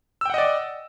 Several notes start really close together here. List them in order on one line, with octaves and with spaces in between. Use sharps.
E6 G5 F#5 D#5 D5